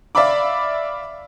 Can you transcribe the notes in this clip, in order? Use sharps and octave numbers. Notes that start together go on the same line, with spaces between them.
D5 E5 F5 B5 D6